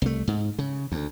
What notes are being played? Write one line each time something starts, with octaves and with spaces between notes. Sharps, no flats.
C2 A3
G#2
C#3
D2